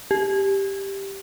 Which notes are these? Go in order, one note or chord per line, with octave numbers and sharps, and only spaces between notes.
G4